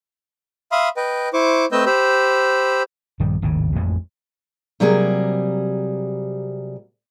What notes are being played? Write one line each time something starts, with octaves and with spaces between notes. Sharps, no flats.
E5 F5 B5 C6 D#6
B4 D#5 G5
E4 C5 C#6 D6
A3 C4 B4 D#5 E6 G6
G4 C5 B5 E6
A#1 G2 D#3 G3
G#1 D#2 A2 C#3
A1 F2 G#3
C3 F#3 G3 A#3 G#4